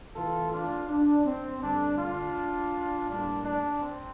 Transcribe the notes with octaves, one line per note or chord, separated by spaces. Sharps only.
C3 E3 A3 F4 A4
D4 F4
D4
C4
G2 D3 A3 D4
D4 F4
A2 G3 A#3 D4
D4
C4